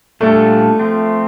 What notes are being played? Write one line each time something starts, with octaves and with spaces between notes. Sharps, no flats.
A#2 G3 A3 D4 F4 A4
F3 A3 C4